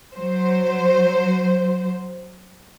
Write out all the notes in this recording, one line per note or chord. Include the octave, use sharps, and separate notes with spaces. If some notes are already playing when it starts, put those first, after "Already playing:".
F#3 C5